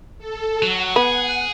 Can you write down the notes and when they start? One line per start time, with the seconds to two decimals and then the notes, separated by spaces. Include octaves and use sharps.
0.19 A4
0.63 F#3 F#5
0.96 B3 G#4